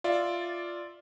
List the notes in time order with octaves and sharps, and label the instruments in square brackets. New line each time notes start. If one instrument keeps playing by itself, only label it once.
[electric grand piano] F4 D5 E5